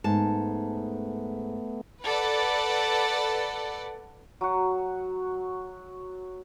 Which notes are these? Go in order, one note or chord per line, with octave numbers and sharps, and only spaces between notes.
G#2 A3 B3 A5
A4 B4 D5 F#5
F#3 F#4